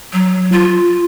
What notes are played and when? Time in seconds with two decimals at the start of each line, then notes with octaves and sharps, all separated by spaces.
0.13 F#3
0.52 F4